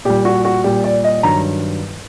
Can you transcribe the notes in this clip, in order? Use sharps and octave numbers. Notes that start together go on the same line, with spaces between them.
A#2 G3 G4
F#4
F#4
A#2 G3 G4
D5
D#5
G2 D#3 F#3 A#5